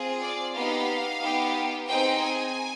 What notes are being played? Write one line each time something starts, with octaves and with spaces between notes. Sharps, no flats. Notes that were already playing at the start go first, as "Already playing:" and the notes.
Already playing: C4 F4 G#4
D5
B3 D#4 G4 F5
B3 D#4 G4
C4 D#4 G#4 G5
G#5